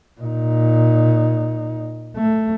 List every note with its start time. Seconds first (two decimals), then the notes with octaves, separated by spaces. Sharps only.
0.21 A#2 D#4
2.17 A3